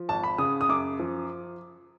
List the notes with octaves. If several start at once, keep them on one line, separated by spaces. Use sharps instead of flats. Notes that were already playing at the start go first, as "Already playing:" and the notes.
Already playing: F3
G#1 A5
B5
C#3 D#6
D#6
F#2 D6
F3